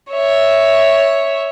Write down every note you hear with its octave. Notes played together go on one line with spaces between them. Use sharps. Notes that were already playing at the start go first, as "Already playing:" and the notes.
C#5 E5